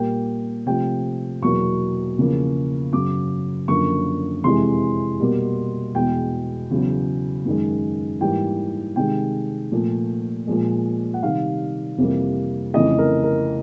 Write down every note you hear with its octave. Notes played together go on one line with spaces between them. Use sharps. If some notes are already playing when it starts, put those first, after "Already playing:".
Already playing: A#2 G3 A#3 G5
C3 F3 A3 G5
E2 B2 F#3 A#3 C#6
E2 C#3 F3 A#3
F#2 C#3 F#3 D6
F#2 D3 F3 A#3 C#6
F2 C3 E3 G#3 C6
B2 G3 A#3
E2 B2 G#3 G5
E2 C#3 F#3
F#2 D#3 G#3
G#2 E3 G3 A#3 G5
C3 D#3 G#3 G5
A#2 F3 A3
A#2 F3 G#3
F#5
C3 D#3 G3 F5
F2 C3 E3 G3 A#3
F2 C#3 E3 A3 D#5
A#4
A#4